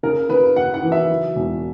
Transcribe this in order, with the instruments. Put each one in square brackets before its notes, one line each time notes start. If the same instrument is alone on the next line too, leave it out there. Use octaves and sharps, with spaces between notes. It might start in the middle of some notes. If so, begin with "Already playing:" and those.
[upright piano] C#3 A#4
C#3 B4
C#3 F#5
F#5
E3
E5
F#3
E1